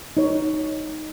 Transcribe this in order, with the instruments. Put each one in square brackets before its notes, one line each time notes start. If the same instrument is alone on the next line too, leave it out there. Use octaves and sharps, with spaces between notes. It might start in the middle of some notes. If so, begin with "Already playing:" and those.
[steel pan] D#4 C#5